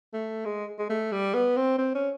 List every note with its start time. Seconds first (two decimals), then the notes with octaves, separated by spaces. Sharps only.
0.13 A3
0.45 G#3
0.79 G#3
0.90 A3
1.12 G3
1.34 B3
1.56 C4
1.78 C4
1.95 C#4